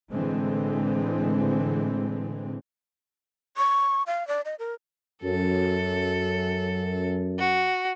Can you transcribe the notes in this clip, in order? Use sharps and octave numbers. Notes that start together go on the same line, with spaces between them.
A2 D3 E3 G#3 C4
C#6
F5
D5
D#5
A#4
F#2 A4
F#4